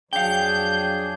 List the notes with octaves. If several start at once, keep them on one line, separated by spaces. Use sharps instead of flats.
F2 F#3 D4 G#4 F5 G5 G6